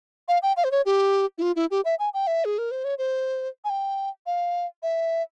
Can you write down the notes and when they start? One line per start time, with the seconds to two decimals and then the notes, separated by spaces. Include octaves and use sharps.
0.28 F5
0.43 G5
0.57 F5
0.64 C5
0.71 C#5
0.86 G4
1.38 E4
1.42 F4
1.56 E4
1.71 G4
1.85 E5
1.99 G#5
2.14 G5
2.27 E5
2.45 G#4
2.58 A#4
2.71 C5
2.84 C#5
2.98 C5
3.64 G#5
3.70 G5
4.26 F5
4.83 E5